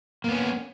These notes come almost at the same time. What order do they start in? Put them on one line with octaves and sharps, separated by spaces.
A#3 B3 C#4